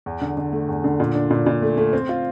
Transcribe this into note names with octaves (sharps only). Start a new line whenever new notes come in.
E2
D3
D3
A3
E2
D3
A#2
D4
A#2
A#2
A3
A3
C4
F4